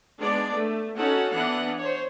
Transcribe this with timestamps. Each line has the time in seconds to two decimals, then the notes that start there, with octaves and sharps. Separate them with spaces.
0.20 G#3 B3 D4 D5
0.55 A3
0.97 C#4 D#4 F#4 A4 F#5
1.34 E3 B3 D4 F#5
1.80 C5 C#5